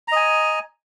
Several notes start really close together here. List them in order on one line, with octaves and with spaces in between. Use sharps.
A#5 D#5 G#5